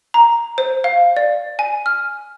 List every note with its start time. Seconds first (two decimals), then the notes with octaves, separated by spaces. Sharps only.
0.14 A#5
0.58 C5
0.84 F5
1.17 D5
1.59 G#5
1.86 F6